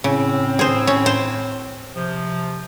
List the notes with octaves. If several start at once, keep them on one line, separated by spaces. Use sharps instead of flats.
A2 C#3 C4
G#4 C5
C#4
C5
C3 F3